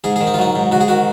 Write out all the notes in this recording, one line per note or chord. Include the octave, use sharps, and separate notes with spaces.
G#2 G#4
D#3 G#4
D#4
F4
F#3 D#4
G#2
G#2 F#4
G#4
D#3 F#4